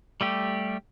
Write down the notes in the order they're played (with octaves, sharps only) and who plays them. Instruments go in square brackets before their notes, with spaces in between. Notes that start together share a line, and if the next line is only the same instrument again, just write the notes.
[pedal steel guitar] G3 A3 G4